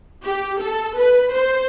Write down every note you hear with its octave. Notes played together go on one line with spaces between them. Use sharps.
G4
A4
B4
C5